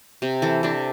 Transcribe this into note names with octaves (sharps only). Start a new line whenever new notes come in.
C3
E3 A4
C3 D4